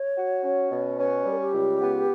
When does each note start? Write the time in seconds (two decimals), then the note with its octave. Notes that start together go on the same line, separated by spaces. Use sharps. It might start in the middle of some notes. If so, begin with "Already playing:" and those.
Already playing: C#5
0.17 F#4
0.43 C#4
0.71 B2
0.98 C#4 B4
1.25 G3
1.31 A#4
1.40 G4
1.53 C#2
1.81 B3